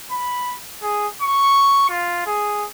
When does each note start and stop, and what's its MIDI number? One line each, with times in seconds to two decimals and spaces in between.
0.11 0.56 83
0.83 1.07 68
1.22 1.88 85
1.90 2.26 65
2.26 2.66 68